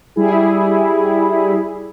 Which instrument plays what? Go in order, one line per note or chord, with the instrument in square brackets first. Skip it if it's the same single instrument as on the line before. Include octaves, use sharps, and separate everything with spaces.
[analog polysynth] G3 E4 G#4